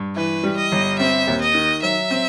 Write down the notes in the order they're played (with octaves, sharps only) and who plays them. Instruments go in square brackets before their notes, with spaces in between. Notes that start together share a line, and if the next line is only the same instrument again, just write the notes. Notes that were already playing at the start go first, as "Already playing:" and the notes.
Already playing: [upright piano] G2
[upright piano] E3 [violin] B4
[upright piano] G3
[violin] D#5
[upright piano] G1
[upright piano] C4 [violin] E5
[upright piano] D#2
[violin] D#5
[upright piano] D#3
[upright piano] F#3 [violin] E5
[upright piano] C4